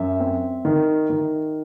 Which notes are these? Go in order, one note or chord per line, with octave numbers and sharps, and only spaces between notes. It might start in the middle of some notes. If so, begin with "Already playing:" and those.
Already playing: F#2 E5
C4
D#3
D#3